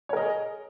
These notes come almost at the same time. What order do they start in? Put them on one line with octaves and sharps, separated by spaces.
C#5 A#4 D#5 G#4